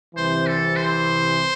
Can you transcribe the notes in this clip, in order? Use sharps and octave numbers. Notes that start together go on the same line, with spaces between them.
C2 C3 E3 C5
A4
C5